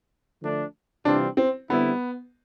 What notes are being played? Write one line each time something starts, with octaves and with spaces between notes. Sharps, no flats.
D3 F3 A3 D4
C3 E3 G3 C4 D4 F4
C4
D3 G3 B3 C4 E4